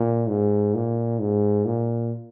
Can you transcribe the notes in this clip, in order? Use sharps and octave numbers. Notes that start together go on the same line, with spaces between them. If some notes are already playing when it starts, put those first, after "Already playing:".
Already playing: A#2
G#2
A#2
G#2
A#2